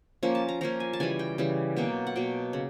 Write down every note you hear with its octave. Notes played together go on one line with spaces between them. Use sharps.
F3 A#3 C#4
A5
A#5
F3 A#3 C#4 A#5
G#5
A5
C#3 E3 G3 G#5
G5
C#3 E3 G3
B2 F#3 A#3 G5
F#5
B2 F#3 A#3 G5
C#3